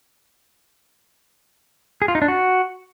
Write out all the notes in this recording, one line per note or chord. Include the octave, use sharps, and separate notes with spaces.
G#4
F4
D#4
D4
F#4